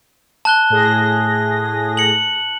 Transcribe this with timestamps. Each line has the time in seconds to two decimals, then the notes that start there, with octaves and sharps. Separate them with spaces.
0.45 A5 F#6 G7
0.70 A2 G#4 A#6
1.97 C#7 F#7